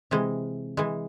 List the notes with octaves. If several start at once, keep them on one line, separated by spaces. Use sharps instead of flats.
C3 E3 G#3
E3 G#3